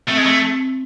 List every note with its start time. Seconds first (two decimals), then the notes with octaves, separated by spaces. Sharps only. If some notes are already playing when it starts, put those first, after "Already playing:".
0.08 A3 C4
0.18 G#3
0.26 A3